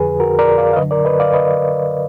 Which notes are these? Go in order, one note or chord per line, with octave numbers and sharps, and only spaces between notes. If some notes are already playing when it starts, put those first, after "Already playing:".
Already playing: F2 D3 F3 G#4 B4
F#4 A#4
A#4 D5
D5 F5
F5
F#2 D3 F#3 B4 D#5
A#4 D5
B4 D#5
D5 F5
B4 D#5